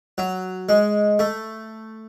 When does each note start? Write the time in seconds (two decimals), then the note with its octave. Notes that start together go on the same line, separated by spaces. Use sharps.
0.18 F#3
0.69 G#3
1.19 A3